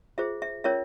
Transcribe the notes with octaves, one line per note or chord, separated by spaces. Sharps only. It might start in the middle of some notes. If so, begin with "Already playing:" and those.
F4 G#4 C5 E5
E5
C#4 F4 A#4 C#5 E5